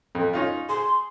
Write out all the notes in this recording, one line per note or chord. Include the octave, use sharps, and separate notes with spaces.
F2
C#4 D#4 F4
G#4 C6